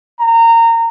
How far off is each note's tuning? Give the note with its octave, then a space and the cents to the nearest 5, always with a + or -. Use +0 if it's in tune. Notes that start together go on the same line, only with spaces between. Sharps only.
A#5 -25